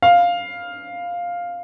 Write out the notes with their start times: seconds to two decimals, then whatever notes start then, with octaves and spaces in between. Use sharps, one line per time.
0.02 F5